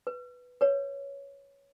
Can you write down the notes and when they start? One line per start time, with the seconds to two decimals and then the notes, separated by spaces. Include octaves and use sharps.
0.07 B4
0.61 B4 C#5